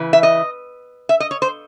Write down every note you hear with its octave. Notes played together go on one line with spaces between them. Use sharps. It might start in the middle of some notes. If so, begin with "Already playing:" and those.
Already playing: C#3 E3
E5
D#5
E5
D#5
C#5
C5